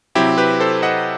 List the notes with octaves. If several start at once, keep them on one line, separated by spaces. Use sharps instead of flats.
C3 F#3 C4 E4 G4
G4 B4
A4 C5
D#5 F#5